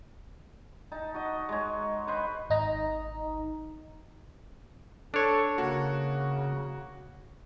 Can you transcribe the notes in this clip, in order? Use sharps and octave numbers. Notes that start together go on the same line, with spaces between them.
D#4 A5
F#4 D#5
G#3 C#5
B4 C5 B5 C#6
G#1 D#4 D#5 A#5
D4 A4 C#5
C#3 A#3 F#4